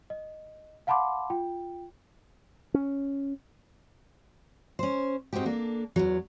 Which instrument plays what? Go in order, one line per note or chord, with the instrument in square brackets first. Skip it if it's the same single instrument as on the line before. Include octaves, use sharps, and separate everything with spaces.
[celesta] D#5
F5 F#5 A5 B5 C6 D6
F4 G5
[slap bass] C#4
[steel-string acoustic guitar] C#4 C5
G#2 C4 D#4 F#4 G4
A#3 D4 A4
E2 F#3